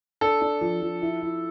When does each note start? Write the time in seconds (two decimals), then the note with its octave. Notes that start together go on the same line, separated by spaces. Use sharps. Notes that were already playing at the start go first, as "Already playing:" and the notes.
0.21 D4 A4
0.41 D4
0.61 F3
0.81 F3
1.02 E4
1.21 E4